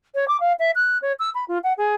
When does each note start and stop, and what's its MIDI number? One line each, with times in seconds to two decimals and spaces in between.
0.15 0.27 73
0.28 0.37 86
0.40 0.53 77
0.59 0.71 76
0.75 0.98 90
1.02 1.13 73
1.19 1.30 88
1.34 1.44 83
1.48 1.58 65
1.64 1.73 78
1.78 1.95 68